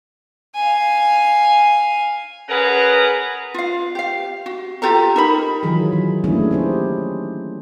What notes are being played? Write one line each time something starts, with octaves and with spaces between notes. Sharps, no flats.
F5 G#5
C#4 G#4 A#4 B4 F#5 A#5
F4 F5
G4 F5
F#4
F4 G4 A4 A#5
D#4 A#4 B5
D#3 E3 F#3 D#4 F4 G#4
F#3
A3 A#3 C#4 D4 E4 G#4
D#4 G4 C5